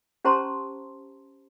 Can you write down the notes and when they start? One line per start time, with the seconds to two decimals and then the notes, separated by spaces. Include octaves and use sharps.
0.24 C#4 G4 C5 A5 A#5 C6